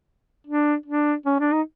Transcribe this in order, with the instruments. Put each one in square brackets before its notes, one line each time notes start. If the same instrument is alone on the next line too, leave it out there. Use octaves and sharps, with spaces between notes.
[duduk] D4
D4
C#4
D4
D#4